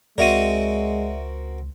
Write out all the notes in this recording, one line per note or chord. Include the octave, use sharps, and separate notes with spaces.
C#2 G#3 C4 F#4 A#4 D5 E5 D#7